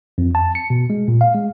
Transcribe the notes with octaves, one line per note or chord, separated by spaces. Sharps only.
F2
A5
C#7
B2
G#3
A#2
F5
G#3